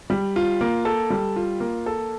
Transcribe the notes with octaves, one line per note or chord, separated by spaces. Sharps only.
G3
F4
A#3
A4
G3
F4
A#3
A4